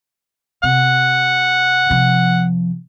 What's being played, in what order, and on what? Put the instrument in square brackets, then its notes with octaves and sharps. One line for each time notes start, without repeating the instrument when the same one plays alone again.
[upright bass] C3 [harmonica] F#5
[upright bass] C3 F3